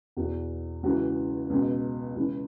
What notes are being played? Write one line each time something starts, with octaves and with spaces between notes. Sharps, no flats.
E2 F#4
B2
C#2 C#3 E3 F#4
C#2 B2
C#2 C#3 E3 E4